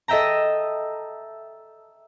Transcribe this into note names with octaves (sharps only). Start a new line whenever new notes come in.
A4 D#5 E5 G5 A#5